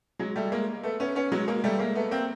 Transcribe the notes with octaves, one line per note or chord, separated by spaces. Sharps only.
F#3 G#3
G3 A3
G#3 A#3
A3 B3
B3 C#4
B3 C#4
F#3 G#3
G#3 A#3
G3 A3
G#3 A#3
A3 B3
A#3 C4